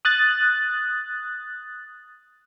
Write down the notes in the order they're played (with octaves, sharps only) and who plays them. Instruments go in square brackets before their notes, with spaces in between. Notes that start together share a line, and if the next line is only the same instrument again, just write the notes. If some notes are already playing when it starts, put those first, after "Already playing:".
[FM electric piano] D#6 F#6 A6